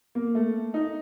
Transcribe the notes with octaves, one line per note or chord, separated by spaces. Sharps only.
A#3
A3
D#4